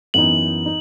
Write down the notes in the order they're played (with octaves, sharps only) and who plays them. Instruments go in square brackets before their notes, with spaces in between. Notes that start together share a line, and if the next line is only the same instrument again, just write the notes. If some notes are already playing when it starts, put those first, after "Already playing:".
[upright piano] F#2 E3 B3 D#4 [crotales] F#7
[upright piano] D#4